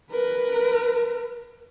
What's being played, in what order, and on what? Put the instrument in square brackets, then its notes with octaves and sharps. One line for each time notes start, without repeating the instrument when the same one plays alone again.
[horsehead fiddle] A#4 B4